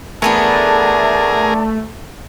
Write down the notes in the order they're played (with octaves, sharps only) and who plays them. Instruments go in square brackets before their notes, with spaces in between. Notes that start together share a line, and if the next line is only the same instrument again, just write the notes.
[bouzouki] E3 B3 D4 [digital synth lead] A3 [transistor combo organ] G#4 A#4 [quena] A5